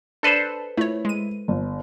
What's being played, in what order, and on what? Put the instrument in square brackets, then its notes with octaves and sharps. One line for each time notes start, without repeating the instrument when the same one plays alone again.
[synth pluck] D4 D5 B5 [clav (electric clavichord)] A4 B4 C5
[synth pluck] A3 C#5 [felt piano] E4
[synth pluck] G#3 D#7
[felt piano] G1